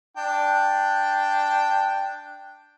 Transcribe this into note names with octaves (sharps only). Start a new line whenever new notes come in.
D4 G5